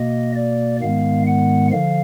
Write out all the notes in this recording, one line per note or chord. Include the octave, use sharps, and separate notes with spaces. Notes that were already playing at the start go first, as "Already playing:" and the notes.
Already playing: B2 A#3 D#5
D5
G#2 D#3 G#3 B3 F5
F#5
D3 F3 F5